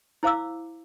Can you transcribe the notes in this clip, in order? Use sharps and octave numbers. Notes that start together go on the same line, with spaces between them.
E4 C5 F5 D6 E6